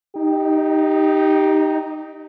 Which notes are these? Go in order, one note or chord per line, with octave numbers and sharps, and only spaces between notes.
D#4 G4